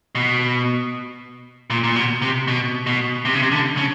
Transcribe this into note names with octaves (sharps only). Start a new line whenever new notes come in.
B2
A#2
A#2
B2
C3
B2
B2
C3
C#3
C3
D3
C#3